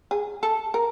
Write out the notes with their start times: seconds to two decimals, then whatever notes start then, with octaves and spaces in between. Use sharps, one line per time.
0.11 G#4
0.43 A4
0.74 A#4